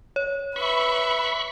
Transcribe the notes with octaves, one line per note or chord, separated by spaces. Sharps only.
C#5
B4 E5 B5 C#6